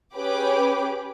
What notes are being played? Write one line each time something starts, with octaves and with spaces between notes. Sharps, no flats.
C#4 G4 G#4 B4 B5 D6